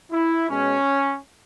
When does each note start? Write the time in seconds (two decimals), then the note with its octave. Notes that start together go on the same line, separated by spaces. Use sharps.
0.12 E4
0.50 B2 G#3 C#4